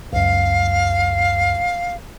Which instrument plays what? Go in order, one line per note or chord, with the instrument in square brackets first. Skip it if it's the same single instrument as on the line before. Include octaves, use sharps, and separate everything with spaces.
[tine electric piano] C#2 F#2 [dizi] F5